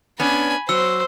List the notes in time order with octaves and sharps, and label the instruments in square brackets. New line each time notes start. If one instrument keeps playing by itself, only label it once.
[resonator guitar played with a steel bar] B3 C#4 D4 [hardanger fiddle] G#5 B5
[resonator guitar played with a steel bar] F#3 [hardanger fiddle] C5 [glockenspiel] E6